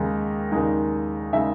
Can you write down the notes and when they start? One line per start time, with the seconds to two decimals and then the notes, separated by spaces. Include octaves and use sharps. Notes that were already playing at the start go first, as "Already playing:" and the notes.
Already playing: D#2 C#3 G#3 D#4
0.52 D#2 C#3 G#3 D#4
1.33 C#3 G#3 D#4 E5